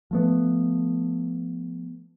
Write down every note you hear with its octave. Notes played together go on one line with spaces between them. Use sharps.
F3 A3 B3